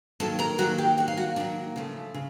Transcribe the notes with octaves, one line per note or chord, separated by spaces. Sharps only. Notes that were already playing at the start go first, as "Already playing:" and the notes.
D#3 F#3 A#3 A4 A5
A#4 A#5
D#3 F#3 A#3 F#4 F#5
G4 G5
D#3 F#3 A#3 F#5
F5
F#4 F#5
D#3 F#3 A#3 D4 D5
C#3 F3 A3
C#3